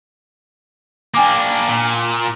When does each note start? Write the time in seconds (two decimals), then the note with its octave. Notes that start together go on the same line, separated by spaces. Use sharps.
1.14 A#3 D4 G5 G#5 D6
1.69 A#2